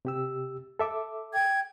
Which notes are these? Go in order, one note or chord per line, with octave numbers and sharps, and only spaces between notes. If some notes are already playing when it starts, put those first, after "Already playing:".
C3 G4 E6
A4 E5 D6
G5 G#6